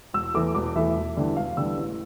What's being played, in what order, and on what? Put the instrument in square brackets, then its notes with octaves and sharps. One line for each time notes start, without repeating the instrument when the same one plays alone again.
[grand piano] E1 E6
E2 E3 A3 D6
E1 D6
E2 E3 A3 E5
E1
E2 D3 G3
E1 F5
E2 D3 G3 E6
A1